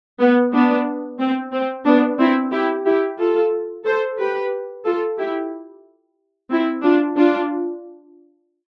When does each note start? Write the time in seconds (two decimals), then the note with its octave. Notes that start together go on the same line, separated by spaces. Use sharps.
0.20 B3
0.53 B3 D4
1.20 C4
1.52 C4
1.86 B3 D4
2.19 C4 E4
2.52 E4 G4
2.85 E4 G4
3.19 F4 A4
3.85 A4 C5
4.18 G4 B4
4.85 F4 A4
5.19 E4 G4
6.50 C4 E4
6.83 D4 F4
7.16 D4 F4